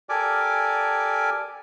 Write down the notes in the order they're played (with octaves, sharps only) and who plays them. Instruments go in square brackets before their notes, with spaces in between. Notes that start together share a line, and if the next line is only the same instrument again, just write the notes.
[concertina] G4 A4 A#4 D5 G#5 D6